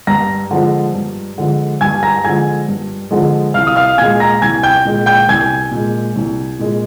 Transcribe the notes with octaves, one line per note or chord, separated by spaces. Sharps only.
G2 A#5 A#6
D3 F3 G#3
G2
D3 F3 G#3
G2 G#5 G#6
A#5 A#6
D3 F3 G#3 G#5 G#6
G2
D3 F3 G#3
C2 F5 F6
D#6
F5 F6
A#2 G#3 G#5 G#6
A#5 A#6
C2 G#5 G#6
G5 G6
A#2 G#3
G5 G6
C2 G#5 G#6
A#2 G#3
C2
A#2 G#3